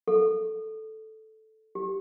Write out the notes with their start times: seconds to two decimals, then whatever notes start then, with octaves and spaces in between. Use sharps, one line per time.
0.08 A4
1.75 G4